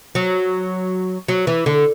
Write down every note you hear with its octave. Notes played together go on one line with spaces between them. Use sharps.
F#3
F#3
E3
D3